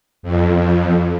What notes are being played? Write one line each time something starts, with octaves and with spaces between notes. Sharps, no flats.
F2